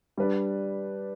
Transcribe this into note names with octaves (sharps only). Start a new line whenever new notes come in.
G3 D4 B4 D5